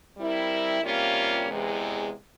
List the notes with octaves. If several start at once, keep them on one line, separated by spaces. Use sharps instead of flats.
G3 C4 E4 A#4
C3 G3 A#3 C#4 F4
E2 C3 E3 G#3